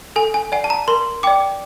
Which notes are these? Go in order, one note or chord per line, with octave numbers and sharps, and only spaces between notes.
A4 G#5
G#5
D5 F#5 G#5
A5
A#5
A#4 C6
D5 G5 D6